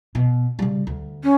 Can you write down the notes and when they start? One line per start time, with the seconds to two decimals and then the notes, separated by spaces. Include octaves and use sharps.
0.15 B2
0.59 C#3 G3
0.87 D2
1.23 C#4